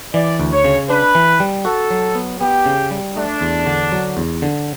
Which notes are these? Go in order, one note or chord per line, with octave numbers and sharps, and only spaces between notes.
E3 D5
D2
C#5
C#3
D4 B4
E3
G3
F#4 A4
F#3
B3
B3 G4
C#3
G3
A3 D4
E2
D3
F#3
E2
D3